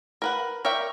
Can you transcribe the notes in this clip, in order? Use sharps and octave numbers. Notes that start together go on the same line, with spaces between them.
A#4 B4 F#5
A#4 C#5 D5 E5 G5